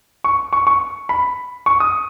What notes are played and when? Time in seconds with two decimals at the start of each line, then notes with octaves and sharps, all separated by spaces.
0.24 C#6
0.53 C#6
0.67 C#6
1.09 B5
1.66 C#6
1.80 D#6